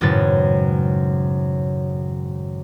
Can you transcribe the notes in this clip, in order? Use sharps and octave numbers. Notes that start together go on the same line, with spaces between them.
G#1 F#2 A2 C#3 B4 A6